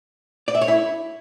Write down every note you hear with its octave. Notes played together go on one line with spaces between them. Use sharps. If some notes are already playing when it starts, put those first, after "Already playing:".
D5
E5
C#5
E4